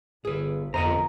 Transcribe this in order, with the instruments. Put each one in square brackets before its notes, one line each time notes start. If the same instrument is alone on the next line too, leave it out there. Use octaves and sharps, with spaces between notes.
[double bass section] G1 [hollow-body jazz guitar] G#4 B4
[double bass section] G1 [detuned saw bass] F2 [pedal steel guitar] A#4 A#5 [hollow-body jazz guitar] C5 D#5 F#5